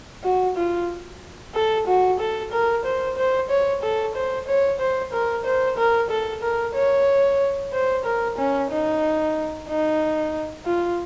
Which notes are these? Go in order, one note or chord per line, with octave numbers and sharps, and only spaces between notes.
F#4
F4
A4
F#4
A4
A#4
C5
C5
C#5
A4
C5
C#5
C5
A#4
C5
A#4
A4
A#4
C#5
C5
A#4
C#4
D#4
D#4
F4